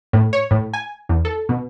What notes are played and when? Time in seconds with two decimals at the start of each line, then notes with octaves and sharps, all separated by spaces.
0.13 A2
0.33 C#5
0.51 A2
0.73 G#5
1.09 E2
1.25 A4
1.49 B2